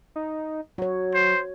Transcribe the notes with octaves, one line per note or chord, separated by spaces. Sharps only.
D#4
F#3 F#4 C#5
C5